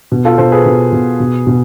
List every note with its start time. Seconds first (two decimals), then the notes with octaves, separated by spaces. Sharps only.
0.12 B2
0.25 F4 A4
0.38 B2 A4 C5
0.52 G#4 B4
0.65 B2
0.93 B2
1.20 B2
1.47 B2